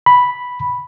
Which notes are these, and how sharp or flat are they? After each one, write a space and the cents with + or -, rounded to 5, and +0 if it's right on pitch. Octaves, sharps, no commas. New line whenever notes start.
B5 +0